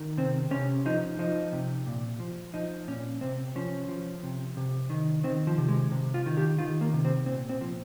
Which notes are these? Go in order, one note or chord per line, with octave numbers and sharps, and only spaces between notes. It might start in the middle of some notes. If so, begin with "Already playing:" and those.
Already playing: D#3
C3 C4
C3 C#4
F3 D#4
F3 D#4
C3
A#2
F3
F3 D#4
A#2 C#4
C3 C4
F3 C#4
F3
C3
C3
D#3
D#3 C4
F3
C3
G#3
C3
F4
D#3
G4
D#3 F4
A#3
C3
C4
A#2 C4
C4
F3